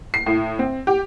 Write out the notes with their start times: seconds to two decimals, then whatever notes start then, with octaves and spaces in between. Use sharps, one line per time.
0.14 C7
0.26 A2
0.59 C4
0.87 G4